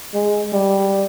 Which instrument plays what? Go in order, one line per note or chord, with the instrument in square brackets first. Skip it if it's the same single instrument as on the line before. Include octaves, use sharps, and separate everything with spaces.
[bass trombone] G#3
G3